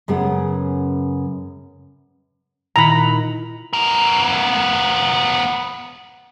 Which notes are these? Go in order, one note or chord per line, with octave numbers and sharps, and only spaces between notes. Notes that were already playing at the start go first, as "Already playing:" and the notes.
F#2 C#3 B3 G#4 F#5
A#2 D#3 E4 A#5 B5
B3 A#4